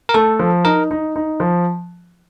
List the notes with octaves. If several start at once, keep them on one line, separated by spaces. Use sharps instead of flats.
A#4
A3 A4
F3
D#4 A#4
D#4
D#4
F3